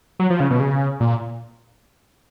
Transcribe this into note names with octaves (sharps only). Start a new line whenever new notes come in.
F#3
F3
C#3
B2
C#3
A#2